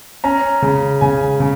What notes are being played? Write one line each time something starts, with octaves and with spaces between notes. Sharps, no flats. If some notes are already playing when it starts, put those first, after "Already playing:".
C#4 A#5
C#3
C#3 G#5
C#3